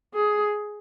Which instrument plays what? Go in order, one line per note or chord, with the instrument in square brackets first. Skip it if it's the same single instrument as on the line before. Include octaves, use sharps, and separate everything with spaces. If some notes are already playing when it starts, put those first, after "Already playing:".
[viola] G#4